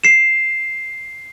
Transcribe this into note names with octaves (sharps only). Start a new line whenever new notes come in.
C7 E7